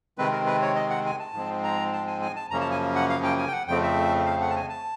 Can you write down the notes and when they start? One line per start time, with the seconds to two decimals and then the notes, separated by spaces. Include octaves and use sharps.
0.18 C3 D#3 G#3 C4 B4
0.32 A#4
0.46 B4
0.62 C#5
0.76 D#5
0.90 F#5
1.06 G#5
1.19 A5
1.34 G#2 F3 G#3 C4
1.64 A#5
1.93 A5
2.07 G#5
2.22 G#5
2.36 A5
2.51 F#2 C#3 F3 A#3 C#4 A#5
2.61 A5
2.71 G#5
2.95 F#5
3.09 F5
3.24 G5
3.38 G#5
3.48 G5
3.53 F#5
3.68 F2 C#3 F3 A3 C4 G5
3.83 E5
4.26 F5
4.41 F#5
4.50 A5
4.56 G#5
4.69 A5